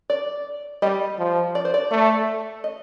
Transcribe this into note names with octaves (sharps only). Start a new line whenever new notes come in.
D5
G3 D#5
F3
D5
C5
D5
A3
D#5